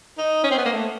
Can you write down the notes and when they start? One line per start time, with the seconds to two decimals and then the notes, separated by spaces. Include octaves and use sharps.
0.18 D#4
0.44 C#4
0.51 C4
0.58 B3
0.66 A#3
0.73 A3